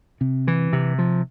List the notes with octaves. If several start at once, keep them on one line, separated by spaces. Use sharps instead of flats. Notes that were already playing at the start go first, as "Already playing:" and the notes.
C3
E3
C3
F3